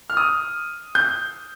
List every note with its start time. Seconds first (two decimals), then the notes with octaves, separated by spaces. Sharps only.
0.10 F6
0.17 D#6
0.95 G6